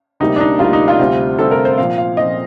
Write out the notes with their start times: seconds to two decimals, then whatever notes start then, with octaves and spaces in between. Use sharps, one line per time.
0.20 D2 C3 G3 A#3 D#4
0.36 D4
0.40 D#4
0.59 D2 C3 G3 A#3 F4
0.73 D#4
0.88 F4
0.99 D2 C3 G3 C4
1.38 D2 C3 G3 C4 A4
1.51 A#4
1.65 C5
1.78 A#2 F3 C4 F5
1.98 F5
2.17 A#2 F3 C4 D#5